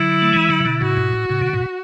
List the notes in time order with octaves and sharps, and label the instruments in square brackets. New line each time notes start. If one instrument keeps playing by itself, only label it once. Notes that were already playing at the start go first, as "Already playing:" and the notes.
Already playing: [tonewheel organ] D3 F#3 [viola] E4
[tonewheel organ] A3
E3 G#3
D3 F#3
C#3
B2 D3
[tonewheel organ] A2 C#3 [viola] F#4
[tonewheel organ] G#2 B2
A2
A2 C#3
B2 D3
G#2 B2